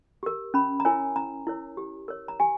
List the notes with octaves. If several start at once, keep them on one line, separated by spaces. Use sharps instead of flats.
G4 A#4
C#4 B5
A#5
E4 A#4 C#5 G#5
C#4 A#5
E4 A#4 C#5
G4
A#4 C#5
A#5
G4 G#5